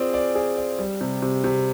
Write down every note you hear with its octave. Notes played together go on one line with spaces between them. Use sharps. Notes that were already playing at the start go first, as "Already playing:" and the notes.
Already playing: C4 F4 G#4 D5
D5
G#4
D5
G3
C3
C3
C3